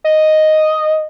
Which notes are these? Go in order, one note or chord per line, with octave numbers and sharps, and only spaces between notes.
D#5